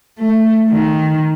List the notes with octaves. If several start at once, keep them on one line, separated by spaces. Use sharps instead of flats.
A3
D#3